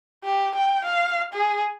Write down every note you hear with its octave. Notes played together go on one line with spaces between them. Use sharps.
G4
G5
F5
G#4